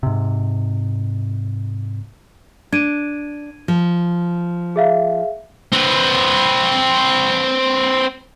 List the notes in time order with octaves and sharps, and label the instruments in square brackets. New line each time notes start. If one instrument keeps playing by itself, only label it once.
[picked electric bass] G#2 C3
[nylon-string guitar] D4 [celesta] G#6 D7 D#7
[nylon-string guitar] F3
[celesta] G#4 E5 F5
[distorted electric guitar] C4 B4